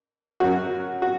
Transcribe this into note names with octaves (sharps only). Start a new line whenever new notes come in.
F#2 F#3 F#4
F#4